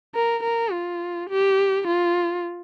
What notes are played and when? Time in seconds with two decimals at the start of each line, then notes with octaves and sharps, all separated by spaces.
0.15 A#4
0.44 A#4
0.72 F4
1.30 G4
1.88 F4